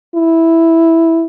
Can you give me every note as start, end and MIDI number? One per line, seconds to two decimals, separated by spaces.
0.15 1.27 64